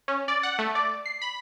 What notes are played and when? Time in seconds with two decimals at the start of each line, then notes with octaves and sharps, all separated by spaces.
0.08 C#4
0.28 D5
0.43 F#5
0.59 A3
0.75 D5
1.06 C7
1.22 B5